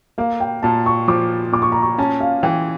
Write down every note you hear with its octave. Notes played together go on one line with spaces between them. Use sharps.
A#3 F5
G5
A#2 A5
C#6
F3 D6
A#2 D6
C#6
A#5
C#6
C#4 A5
F5
E3 G5